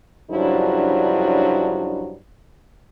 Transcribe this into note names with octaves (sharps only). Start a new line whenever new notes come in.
G2 C#3 F3 F#3 D4 E4